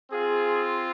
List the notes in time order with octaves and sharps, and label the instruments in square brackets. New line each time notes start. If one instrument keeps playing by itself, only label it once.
[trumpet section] C4 F4 G#4